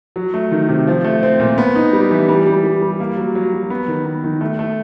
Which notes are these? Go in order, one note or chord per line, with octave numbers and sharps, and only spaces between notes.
F#3
A3
D#3
C3
F3
A3
C4
A#2
B3
D#4
G3
E3
G3
G3
G3
G3
A#3
F#3
F#3
F#3
B3
D#3
B3
D#3
A3
A3